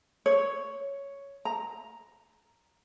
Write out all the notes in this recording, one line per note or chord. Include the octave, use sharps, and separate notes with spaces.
C#5
A#5